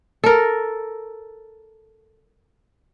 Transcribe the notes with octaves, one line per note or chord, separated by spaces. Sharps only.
A4 A#4